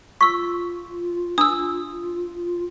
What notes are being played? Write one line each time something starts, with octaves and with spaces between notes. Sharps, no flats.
F4 C#6 E6 B6
D4 D#6 E6